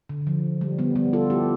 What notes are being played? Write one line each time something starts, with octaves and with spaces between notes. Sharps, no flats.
D3
F3
G3
G3 B3
G3 B3
F4 A4
E4 G4